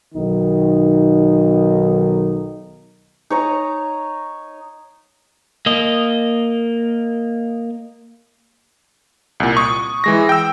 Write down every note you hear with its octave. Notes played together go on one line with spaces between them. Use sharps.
B1 D#3 D#4
D#4 C#5 A#5
A#3 D#5
C2 A#2
C#6 D#6
E3 G#3 A#6
G5 E6